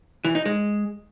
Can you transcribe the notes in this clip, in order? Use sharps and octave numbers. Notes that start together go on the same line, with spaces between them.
E3
D#4
G#3